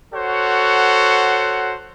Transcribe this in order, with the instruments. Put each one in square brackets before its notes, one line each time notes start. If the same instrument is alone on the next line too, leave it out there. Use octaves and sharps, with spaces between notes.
[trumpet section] F#4 A4 C5 C#5 F#5